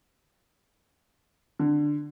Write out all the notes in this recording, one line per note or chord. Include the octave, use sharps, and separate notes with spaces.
D3